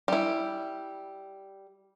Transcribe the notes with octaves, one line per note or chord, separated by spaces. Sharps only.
G3 E4